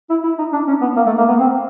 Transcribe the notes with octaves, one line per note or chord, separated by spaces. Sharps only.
E4
E4
D#4
D4
C#4
B3
A#3
A3
A#3
B3
C4